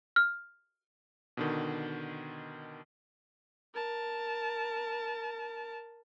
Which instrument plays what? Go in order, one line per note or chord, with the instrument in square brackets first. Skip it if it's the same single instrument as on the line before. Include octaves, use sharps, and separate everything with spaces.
[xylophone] F6
[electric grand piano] B2 D3 D#3
[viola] A#4 A5